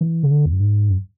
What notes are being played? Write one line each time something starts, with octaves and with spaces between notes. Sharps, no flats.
E3
C#3
D3
E2
F#2
G#2
F#2